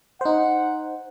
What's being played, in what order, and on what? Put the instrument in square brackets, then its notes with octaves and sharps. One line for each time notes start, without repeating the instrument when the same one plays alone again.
[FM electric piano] D#4 C5 [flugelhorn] F#5